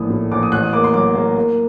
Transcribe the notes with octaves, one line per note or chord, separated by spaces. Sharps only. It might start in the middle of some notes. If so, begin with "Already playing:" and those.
Already playing: A#1 A2 A3 D#6
A2
A#1 D6
D#6
A1 F#6
D#6
A#3 D6
C6
F#3 D6
A#3
A#3